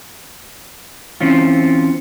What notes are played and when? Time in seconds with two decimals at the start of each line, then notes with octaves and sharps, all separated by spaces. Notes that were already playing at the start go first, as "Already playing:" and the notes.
1.20 E3 C4 C#4 F4